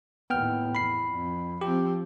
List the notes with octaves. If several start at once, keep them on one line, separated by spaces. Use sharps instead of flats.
D#2 A2 B3 G5 F6
E2 B5 C7
F2
F3 C4 G4